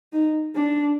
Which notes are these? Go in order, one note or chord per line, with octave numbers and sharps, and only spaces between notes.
D#4
D4